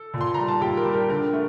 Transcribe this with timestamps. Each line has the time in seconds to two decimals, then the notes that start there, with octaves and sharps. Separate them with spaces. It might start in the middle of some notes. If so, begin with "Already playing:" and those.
Already playing: A4
0.14 A#2
0.21 C6
0.34 G3 A#5
0.48 A5
0.61 A#2 G4 G5
0.77 A#4
0.85 G3
0.94 A#4
1.09 D3 A#4
1.33 A3